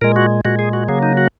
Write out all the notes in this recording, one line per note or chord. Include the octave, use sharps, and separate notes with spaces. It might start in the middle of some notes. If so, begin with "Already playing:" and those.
A#2 G#3 A#4
F#4
A#2 G#3 F#4
G#4
F#4
C#3 F#3 A#3 G#4
D#4
F#4